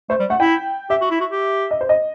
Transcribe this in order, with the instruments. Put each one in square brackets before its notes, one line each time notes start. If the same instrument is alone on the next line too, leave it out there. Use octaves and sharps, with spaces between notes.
[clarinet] A3 [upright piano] C5
[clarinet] G3
[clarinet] A3 [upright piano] F#5
[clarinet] E4 [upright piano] G5
[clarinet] G4 [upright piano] E5
[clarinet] F#4
E4
F#4
G4
[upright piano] D#5
C5
D#5